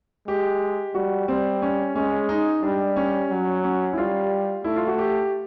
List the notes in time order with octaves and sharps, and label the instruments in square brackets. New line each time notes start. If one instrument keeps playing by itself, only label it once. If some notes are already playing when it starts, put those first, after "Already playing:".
[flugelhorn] G#3 [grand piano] G4
[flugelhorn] G3 [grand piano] F#4
[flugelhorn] G3 [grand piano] C4
[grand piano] C#4
[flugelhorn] G#3 [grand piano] C#4
[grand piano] D#4
[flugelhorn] G3 [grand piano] D4
[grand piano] C#4
[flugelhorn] F#3
[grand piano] C#4
E4
[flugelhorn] G3 [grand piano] F4
[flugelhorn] A3 [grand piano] E4
[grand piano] F4
F#4
G4